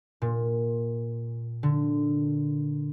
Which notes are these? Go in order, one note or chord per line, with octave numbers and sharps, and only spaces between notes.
A#2
D3